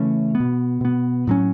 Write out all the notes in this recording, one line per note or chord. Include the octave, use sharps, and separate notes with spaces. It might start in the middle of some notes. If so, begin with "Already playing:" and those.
Already playing: C#3 E3 A3 C#4
B3
B2
B2 B3
A2 F#3 C#4